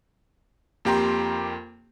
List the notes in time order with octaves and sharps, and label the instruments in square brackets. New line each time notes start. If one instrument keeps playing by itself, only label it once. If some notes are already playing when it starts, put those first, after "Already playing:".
[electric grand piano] F2 A#3 G4 G5 A#5 C6